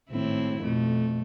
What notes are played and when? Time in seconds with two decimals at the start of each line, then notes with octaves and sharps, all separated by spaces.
0.10 G#1 A2 C4 E4
0.62 F2 B2 A3